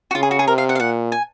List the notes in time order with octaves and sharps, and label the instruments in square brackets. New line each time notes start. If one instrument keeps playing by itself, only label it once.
[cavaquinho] F#4
[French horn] C#3 [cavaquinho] F4
[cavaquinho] G#4
F#4
G#4
[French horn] C3 [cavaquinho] A#4
[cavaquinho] F5
F#5
F5
[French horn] A#2 [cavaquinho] F#5
[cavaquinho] G#5